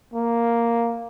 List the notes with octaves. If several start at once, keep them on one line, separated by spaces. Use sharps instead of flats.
A#3